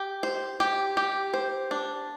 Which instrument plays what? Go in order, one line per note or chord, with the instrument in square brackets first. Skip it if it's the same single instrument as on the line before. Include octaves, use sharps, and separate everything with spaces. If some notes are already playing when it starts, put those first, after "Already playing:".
Already playing: [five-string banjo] G4
C5
G4
G4
C5
D4